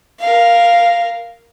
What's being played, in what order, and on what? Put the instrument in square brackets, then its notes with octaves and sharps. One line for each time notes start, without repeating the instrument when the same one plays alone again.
[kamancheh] A#4 F5